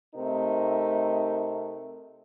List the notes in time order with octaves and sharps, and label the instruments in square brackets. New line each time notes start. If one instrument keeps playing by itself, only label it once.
[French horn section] C3 A3 D#4 A#4